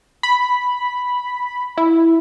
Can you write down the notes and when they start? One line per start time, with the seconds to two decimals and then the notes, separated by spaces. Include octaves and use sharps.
0.23 B5
1.77 E4